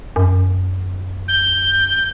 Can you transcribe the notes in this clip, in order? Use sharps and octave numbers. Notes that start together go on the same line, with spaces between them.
F#2
G6